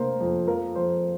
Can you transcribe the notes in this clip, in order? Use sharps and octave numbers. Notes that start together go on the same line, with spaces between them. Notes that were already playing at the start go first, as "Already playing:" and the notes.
Already playing: C3 A#3 D4 A#4 C5
F2
F3 A#4
F2 C5